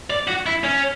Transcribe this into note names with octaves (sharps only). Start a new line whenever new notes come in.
D5
F#4
E4
C#4